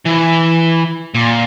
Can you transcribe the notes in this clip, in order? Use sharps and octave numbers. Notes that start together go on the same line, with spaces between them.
E3
A#2